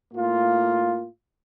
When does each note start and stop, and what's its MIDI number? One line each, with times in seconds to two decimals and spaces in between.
0.14 1.07 45
0.14 1.07 58
0.14 1.07 65